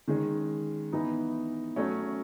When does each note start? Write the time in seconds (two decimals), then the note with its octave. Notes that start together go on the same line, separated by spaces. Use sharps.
0.08 D#3 G#3 C#4
0.93 E3 B3 D#4
1.76 F#3 A3 C#4